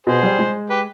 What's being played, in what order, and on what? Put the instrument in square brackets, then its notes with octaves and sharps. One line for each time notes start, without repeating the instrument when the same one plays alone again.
[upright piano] B2 [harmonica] G#4 C5
[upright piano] G3
G#3
[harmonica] G4 B4